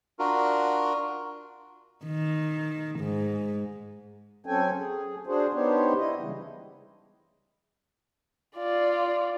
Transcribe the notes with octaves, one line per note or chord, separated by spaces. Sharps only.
D4 F4 F#4 A#4
D#3
G#2
F#3 C4 C#4 A4 G5 G#5
G#4
D4 F#4 G#4 C5
B3 D4 D#4 G4 C5 C#5
E4 D#5
C#3 E3 G3 G#3
F4 D5